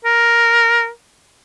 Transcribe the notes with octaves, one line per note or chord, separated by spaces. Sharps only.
A#4